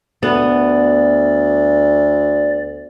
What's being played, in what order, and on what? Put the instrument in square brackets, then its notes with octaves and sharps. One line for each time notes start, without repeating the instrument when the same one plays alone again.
[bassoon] D2 [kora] B3 [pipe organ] D5